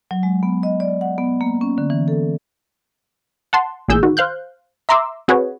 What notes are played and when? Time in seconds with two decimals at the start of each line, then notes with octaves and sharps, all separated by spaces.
0.11 F#3
0.23 G#3
0.43 B3
0.63 D#5
0.80 D5
1.01 F#5
1.18 B3
1.41 A#3
1.61 C#4
1.78 D3
1.90 E3
2.08 A4
3.53 F#5 A5 C6
3.88 A1 A#2 G#4 E6 G6
4.03 D#3 F#4
4.17 C5 F5 F#6 G6
4.89 E5 A#5 C6 D6 E6
5.28 C4 F#4 G#4 B4 C#5